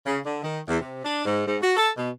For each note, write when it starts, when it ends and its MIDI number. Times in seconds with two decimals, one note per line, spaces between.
0.06 0.18 49
0.25 0.38 50
0.43 0.59 51
0.68 0.80 40
0.81 1.03 48
1.05 1.24 62
1.26 1.43 44
1.47 1.58 44
1.63 1.75 66
1.77 1.90 69
1.97 2.09 47